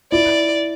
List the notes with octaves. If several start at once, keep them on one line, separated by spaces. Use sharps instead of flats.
E4 D5